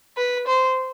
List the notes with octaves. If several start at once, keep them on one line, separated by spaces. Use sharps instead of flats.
B4
C5